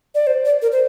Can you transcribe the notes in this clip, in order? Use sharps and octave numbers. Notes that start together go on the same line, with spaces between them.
D5
C5
D5
A#4
C5